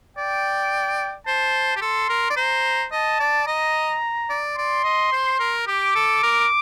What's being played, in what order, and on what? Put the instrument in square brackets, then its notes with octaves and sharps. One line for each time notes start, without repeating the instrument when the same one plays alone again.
[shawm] D5 [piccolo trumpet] G5
[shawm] C5 [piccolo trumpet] A5
[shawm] G4
[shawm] A4 [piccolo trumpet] C6
[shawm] A#4
D5
[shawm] C5 [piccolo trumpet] A#5
[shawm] D#5 [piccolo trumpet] A5
[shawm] D5
[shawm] D#5 [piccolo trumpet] A#5
[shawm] D5
[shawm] D5 [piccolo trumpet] C6
[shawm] D#5
C5
A#4
[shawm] G4 [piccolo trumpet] D6
[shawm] A4
A#4